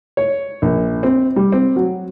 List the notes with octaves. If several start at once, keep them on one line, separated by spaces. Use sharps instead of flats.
C#5
A#1
C4
G3
C4
F#3